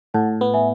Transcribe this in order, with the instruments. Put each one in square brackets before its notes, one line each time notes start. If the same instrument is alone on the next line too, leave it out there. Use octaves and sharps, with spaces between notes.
[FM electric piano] A2 [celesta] F#5 A5
[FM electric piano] B3
[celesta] E5 G#5